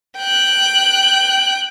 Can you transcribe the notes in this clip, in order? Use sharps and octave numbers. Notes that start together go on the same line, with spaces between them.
G5 F#6